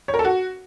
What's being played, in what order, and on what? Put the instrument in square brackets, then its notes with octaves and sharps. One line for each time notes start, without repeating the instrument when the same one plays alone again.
[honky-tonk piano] C#5
A#4
A4
F#4